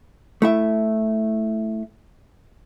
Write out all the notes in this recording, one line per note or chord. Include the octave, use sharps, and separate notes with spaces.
A3 E4 E5